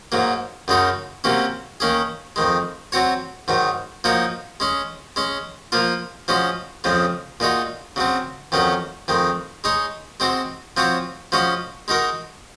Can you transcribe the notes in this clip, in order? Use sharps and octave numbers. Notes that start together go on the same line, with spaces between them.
G#2 F#3 A#3
F#2 C#3 G#3 D#4 F#4
C3 F#3 A#3 C#4
D#3 A#3 C#4 G#4
F2 D#3 G#3
F#3 C4 F#4 C#5
G#2 D#3 F#3
F3 A#3 D#4 F#4 C#5
G#3 C#4 G#4
G#3 C#4 G#4
F3 A#3 F4
F3 G#3 C#4 F#4
F2 C#3 F3 G#3
A#2 G#3 D#4 F#4
C#3 F#3 C4
F2 D#3 F#3 C#4 G#4
F2 D#3 G#3
G#3 D#4 G#4 C#5
G#3 C4 F#4 C5
F3 C4 F#4 C#5
F3 G#3 C#4 F#4 C#5
G#3 D#4 F#4 A#4